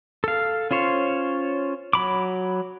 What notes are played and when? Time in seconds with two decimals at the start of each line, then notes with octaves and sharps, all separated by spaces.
0.24 A4 F5
0.71 C#4 F4 C5 C#5
1.93 F#3 B5 D6